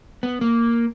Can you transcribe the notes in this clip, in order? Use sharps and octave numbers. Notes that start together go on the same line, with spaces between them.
B3
A#3